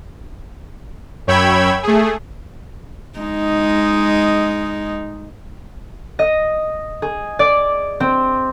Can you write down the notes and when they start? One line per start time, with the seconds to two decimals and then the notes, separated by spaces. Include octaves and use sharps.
1.27 F#2 C#5 G5 B5 E6 G#6
1.83 A3 G#4
3.19 G#3 D#4
6.19 D#5
7.02 G#4
7.39 D5
8.00 C4